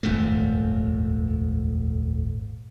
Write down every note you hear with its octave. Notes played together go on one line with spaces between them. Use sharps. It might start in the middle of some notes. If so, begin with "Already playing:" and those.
D#1 G#1 F2 A3